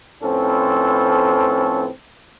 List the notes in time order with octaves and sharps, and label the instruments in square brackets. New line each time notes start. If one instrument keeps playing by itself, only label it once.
[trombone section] A2 F3 C4 C#4 A4 B4